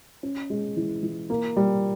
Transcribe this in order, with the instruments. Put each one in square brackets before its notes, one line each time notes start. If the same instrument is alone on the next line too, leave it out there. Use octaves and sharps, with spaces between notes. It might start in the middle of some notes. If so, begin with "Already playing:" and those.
[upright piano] C#4
G#3
E3
E3
A#3
G3